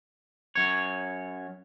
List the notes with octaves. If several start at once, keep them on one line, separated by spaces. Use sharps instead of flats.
F#2 C#5